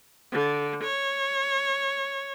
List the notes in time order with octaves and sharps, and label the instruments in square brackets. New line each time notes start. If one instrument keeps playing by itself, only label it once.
[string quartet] D3
C#5